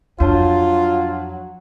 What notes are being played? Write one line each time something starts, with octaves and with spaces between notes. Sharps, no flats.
F2 F#3 D4 F4 C#5 A5